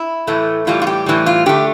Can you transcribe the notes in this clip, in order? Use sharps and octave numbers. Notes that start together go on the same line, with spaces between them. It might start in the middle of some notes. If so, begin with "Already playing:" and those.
Already playing: E4
A2 E3 A3
A2 E3 G3 F4
F4
G4
A2 E3 G3
F4
D3 A3 G4